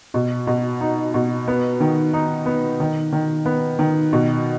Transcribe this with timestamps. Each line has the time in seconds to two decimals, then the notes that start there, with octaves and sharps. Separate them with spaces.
0.14 B2
0.47 B2
0.81 D#4
1.14 B2
1.48 B3
1.80 D#3
2.13 D#4
2.46 B3
2.80 D#3
3.13 D#3
3.46 B3
3.79 D#3
4.13 B2